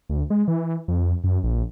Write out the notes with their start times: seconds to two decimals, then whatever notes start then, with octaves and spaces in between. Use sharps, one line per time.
0.09 D2
0.30 G#3
0.48 E3
0.88 F2
1.24 F#2
1.44 A#1